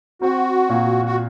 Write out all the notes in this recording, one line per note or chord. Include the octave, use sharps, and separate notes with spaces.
C4 F#4
A#2
F#4